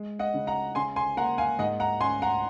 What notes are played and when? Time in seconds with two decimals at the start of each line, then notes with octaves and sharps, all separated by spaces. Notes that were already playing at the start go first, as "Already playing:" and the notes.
Already playing: G#3
0.19 D#5 F#5
0.34 C#3
0.47 F#5 A#5
0.75 C#3 G#5 C6
0.96 G#5 C6
1.17 A#3 F#5 A#5
1.38 F5 G#5
1.59 G#2 D#5 F#5
1.80 F#5 A#5
2.01 C#4 G#5 C6
2.22 F#5 A#5